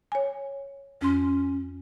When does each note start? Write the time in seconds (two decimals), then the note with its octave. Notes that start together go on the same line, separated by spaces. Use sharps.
0.12 C#5 G#5
1.01 F2 C#4 C6